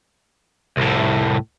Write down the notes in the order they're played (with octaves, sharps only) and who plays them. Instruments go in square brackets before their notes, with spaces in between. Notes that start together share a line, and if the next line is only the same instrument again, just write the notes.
[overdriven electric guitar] C2 A2